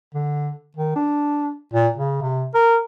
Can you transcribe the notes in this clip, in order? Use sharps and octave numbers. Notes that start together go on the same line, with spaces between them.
D3
D#3
D4
A#2
C#3
C3
A#4